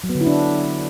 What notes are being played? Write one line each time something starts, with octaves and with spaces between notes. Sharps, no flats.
F#3
B3
D3
E4
D4